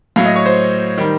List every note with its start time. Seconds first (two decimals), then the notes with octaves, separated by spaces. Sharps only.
0.16 A2 F#3 F5
0.26 D#5
0.36 C#5
0.46 C5
0.98 D#3 G3